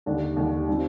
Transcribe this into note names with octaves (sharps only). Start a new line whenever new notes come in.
D#2 D3 G3 D4
D#2 D3 G3 D4
D#3 G3 C4 F4